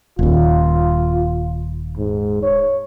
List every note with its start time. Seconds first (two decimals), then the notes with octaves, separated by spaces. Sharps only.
0.19 D#1 D#2 F4
1.97 G#2
2.43 C#5